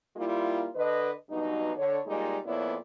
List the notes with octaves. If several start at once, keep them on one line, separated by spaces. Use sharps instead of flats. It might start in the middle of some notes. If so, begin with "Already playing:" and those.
G3 A#3 E4 F4
D3 B4 D#5
G2 B2 F#3 D#4
D3 C#5
A#2 G3 G#3 D#4 G4 D5
F2 A#2 B3 E4 C#5 D5